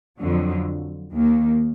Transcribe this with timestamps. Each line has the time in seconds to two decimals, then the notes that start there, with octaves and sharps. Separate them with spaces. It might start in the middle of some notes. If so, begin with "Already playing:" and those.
0.19 F2 D3 F#3
1.13 D#2 D#3 A#3